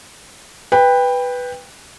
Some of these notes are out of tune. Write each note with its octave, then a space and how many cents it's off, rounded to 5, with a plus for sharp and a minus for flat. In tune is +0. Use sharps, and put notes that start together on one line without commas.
B4 +0 G5 +20